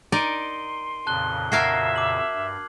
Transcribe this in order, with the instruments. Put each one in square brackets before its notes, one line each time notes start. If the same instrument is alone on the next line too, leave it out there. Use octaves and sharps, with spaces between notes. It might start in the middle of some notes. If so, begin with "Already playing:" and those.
[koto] D#4 A#4 D5 [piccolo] C6 [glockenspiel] D7 D#7 G7
[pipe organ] F2 A#2 C#3 [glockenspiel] A5 F#6 G7
[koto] F#4 A#4 F5 [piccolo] E5 [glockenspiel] F6 G#6 C7
[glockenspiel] D6 F#7
[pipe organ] G2